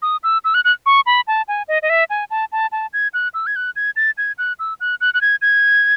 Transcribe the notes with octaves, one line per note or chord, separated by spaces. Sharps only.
D#6
E6
E6
F#6
F#6
C#6
B5
A5
G#5
D#5
D#5
E5
G#5
A5
A5
A5
G#6
F#6
E6
G#6
F#6
G#6
A6
G#6
F#6
E6
F#6
F#6
F#6
G#6
G#6